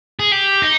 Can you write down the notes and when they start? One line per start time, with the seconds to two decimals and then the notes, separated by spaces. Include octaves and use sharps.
0.19 G#4
0.32 G4
0.62 D#4